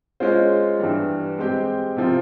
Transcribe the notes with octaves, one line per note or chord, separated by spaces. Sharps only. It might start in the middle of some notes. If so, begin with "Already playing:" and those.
G#3 C#4 F4 C5
G2 E3 G3
G#3 C4 G4
C3 F3 C4 F4